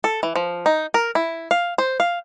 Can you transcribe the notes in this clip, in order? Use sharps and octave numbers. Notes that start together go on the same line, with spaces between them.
A4
E3
F3
D#4
A#4
E4
F5
C5
F5